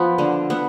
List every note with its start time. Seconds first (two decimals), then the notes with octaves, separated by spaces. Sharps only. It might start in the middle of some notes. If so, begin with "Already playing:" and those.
Already playing: F3 B3 B5
0.18 D3
0.50 B3